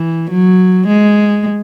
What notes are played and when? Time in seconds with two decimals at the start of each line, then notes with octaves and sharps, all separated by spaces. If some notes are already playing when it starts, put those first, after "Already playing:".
Already playing: E3
0.30 F#3
0.87 G#3